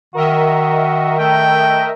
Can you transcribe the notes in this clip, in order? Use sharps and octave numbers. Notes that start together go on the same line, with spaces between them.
D#3 F#4 A#4 D#5 E5
A3 G5